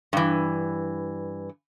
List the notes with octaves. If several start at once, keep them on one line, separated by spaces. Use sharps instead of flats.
G2 E3